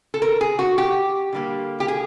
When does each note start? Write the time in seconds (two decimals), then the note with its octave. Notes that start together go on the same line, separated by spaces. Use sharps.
0.14 A4
0.22 A#4
0.41 G#4
0.59 F#4
0.78 G4
1.33 D3 G3 A#3
1.80 G4
1.88 G#4